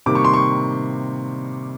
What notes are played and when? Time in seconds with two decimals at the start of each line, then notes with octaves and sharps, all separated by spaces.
0.06 C3 D#3 G3 A#3 D6
0.15 C#6
0.25 C6
0.34 C#6